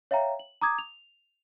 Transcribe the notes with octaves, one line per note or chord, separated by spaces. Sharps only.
C#5 E5 F5 G5 A#5
F#7
A#5 D6 D#6 G#6
F7